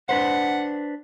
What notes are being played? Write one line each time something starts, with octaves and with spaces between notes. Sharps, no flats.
D4 B4 C5 F#5